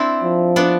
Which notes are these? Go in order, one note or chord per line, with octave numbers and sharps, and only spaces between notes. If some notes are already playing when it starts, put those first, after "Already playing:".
Already playing: C4 D4 E4
F3
B3 D4